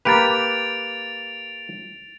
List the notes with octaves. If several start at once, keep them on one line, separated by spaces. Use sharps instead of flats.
A#3 G4 B4 A6 D7 F7